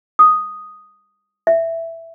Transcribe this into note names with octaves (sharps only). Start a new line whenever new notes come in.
D#6
E5